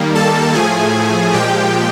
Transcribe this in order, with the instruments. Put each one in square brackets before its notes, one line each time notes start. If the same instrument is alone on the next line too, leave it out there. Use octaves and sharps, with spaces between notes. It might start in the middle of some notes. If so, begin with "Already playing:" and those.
Already playing: [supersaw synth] D#3 G3 A#3
A4 A5
A2 F3 A3 G#4 G#5
A#2 F3 G#3 G4 G5